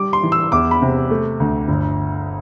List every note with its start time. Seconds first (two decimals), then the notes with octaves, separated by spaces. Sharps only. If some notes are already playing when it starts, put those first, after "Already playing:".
Already playing: G3 D6
0.13 C6
0.23 E3
0.32 E6
0.52 E2 D6
0.71 B5
0.82 C3
1.10 A3
1.40 D2
1.68 G1